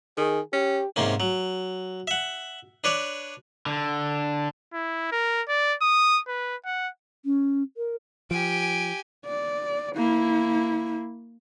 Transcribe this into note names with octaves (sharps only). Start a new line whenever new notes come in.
D#3 G#4
C#4 G4
G#2 C3 A#3 C#4
F#3
E5 F#5
D4 B4 C#5 D5
D3
E4
A#4
D5
D#6
B4
F#5
C#4
A#4
F3 G4 G#5 D7
D5
A#3 E4